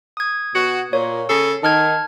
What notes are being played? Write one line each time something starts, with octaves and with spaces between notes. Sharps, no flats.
D#6 G#6
B2 F#4
A#2 C#5
C#3 G#4 A4
D#3 A5 F6 G#6